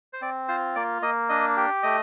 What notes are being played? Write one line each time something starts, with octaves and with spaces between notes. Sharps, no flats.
C5
C4 D5
F4 C5
A#3 D5
A#3 D#5
D4 D#5
G4
A3 D#5